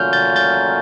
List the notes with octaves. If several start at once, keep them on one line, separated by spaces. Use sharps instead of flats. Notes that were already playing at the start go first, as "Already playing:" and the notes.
Already playing: A#2 F#3 A3 C#4 F4 F6 G6
G6 A6
G6 A6